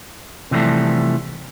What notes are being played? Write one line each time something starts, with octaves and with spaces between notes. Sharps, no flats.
C3 E3 F3 G3 A3